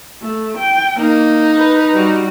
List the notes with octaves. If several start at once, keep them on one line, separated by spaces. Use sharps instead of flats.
A3
G5
A#3 D#4
B4
G3 F#4